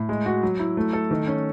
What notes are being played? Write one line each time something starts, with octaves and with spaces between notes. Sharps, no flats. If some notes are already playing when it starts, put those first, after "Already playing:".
Already playing: A2
G#3
F#4
F#3
E4
A3
A4
D#3
C#4